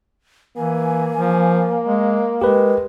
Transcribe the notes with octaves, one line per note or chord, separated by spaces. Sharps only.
E3 A#3 G#5
F3
G#3
G#3 G4 A#4 B4